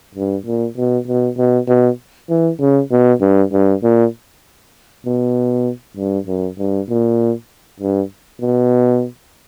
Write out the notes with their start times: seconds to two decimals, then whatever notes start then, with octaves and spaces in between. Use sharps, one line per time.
0.15 G2
0.46 A#2
0.77 B2
1.08 B2
1.37 B2
1.68 B2
2.29 E3
2.60 C#3
2.91 B2
3.21 G2
3.52 G2
3.83 A#2
5.06 B2
5.97 G2
6.27 F#2
6.59 G2
6.89 A#2
7.80 G2
8.41 B2